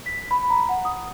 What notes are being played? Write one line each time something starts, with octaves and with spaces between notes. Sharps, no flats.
B6
B5
A#5
F#5
D#6